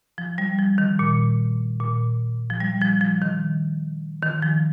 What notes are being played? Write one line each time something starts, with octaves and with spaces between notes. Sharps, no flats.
F3
G3
F3
D#3
A#2
A#2
F3
G3
F3
F3
D#3
D#3
F3